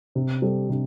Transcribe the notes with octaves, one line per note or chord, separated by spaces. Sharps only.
C3
G3 C4 A4
C3